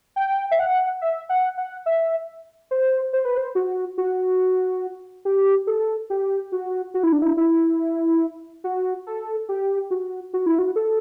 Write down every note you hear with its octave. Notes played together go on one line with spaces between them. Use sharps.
G5
E5
F#5
E5
F#5
F#5
E5
C5
C5
B4
C5
F#4
F#4
G4
A4
G4
F#4
F#4
E4
D4
E4
E4
F#4
A4
G4
F#4
F#4
E4
F#4
A4